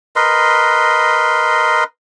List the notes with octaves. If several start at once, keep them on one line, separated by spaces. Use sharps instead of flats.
A#4 B4 D#5 C6